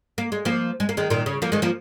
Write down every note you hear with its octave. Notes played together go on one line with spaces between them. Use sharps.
A#3
G#3
F3 A#3
G#3
A#3
D#3 G#3
A#2 D#3
C#3
F3 A#3
D#3 G#3
F3 A#3